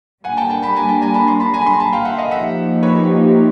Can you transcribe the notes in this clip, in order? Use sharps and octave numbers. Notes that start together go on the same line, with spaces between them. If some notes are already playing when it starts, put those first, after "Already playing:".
G3 A#3 D4 F#5 G#5
G5 A5
G5 A5
A5 B5
G#5 A#5
G5 A5
G#5 A#5
A5 B5
A#5 C6
A5 B5
G#5 A#5
B5
A#5 C6
A5 B5
F5 G5
E5 F#5
D#5 F5
F3 A#3 D#4 G4 E5 F#5
B4 C#5